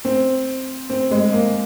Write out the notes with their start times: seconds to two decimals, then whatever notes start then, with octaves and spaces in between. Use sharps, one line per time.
0.05 C4
0.90 C4
1.11 G#3
1.33 A#3